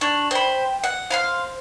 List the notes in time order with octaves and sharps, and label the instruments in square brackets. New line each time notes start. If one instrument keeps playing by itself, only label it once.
[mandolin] D4 [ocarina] C#6
[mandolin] C5 B5 [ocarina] G5
[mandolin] F#5
[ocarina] C5 [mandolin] F5 B5 C6